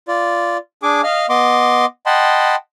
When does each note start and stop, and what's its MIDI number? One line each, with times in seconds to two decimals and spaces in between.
0.08 0.57 65
0.08 0.57 74
0.83 1.01 62
0.83 1.01 68
0.83 1.01 80
0.83 1.01 86
1.04 1.26 75
1.04 1.26 77
1.04 1.26 89
1.30 1.86 59
1.30 1.86 75
1.30 1.86 84
1.30 1.86 86
2.06 2.56 75
2.06 2.56 78
2.06 2.56 79
2.06 2.56 81
2.06 2.56 83
2.06 2.56 84